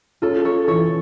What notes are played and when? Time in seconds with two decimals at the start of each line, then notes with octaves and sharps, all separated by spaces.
0.22 C#4 F4 A4
0.45 A4 C#5
0.67 E3 A4 C#5